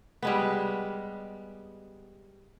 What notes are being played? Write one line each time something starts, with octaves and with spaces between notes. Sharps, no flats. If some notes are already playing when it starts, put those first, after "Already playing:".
G3 G#3 B3